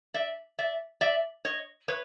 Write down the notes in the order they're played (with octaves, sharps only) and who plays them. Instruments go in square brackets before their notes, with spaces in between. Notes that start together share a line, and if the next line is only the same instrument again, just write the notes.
[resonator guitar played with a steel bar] D5 E5
D5 E5
D5 E5
C#5 D#5
B4 C#5